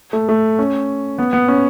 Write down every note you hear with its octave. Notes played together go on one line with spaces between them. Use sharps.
A3
A3
C#4
B3
B3
C#4